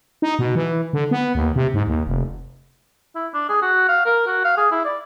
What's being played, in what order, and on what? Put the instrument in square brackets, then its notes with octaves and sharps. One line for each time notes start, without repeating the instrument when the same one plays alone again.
[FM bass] D#4
B2
E3
D3
B3
D#2
C3
G#2
D#2
F1
[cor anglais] E4
D4
G#4
F#4
F5
A#4
F#4
F5
G#4
E4
D5